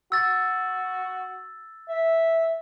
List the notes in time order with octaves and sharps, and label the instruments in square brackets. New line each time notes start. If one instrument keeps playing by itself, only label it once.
[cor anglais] F#4 [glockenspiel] E6 A6
[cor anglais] E5